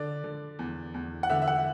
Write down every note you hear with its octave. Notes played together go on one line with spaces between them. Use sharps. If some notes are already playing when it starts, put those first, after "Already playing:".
Already playing: D3 D5
D3
E2
E2
F#5
D3 E5
E5
F#5